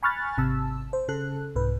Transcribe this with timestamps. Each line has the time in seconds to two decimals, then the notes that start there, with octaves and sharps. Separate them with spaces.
0.03 G#5 B5 C#6 F6 F#6 A6
0.37 G#1 C3 A5 E6
0.93 C5
1.08 C#3 A4 F#6
1.55 C2 G#2 B4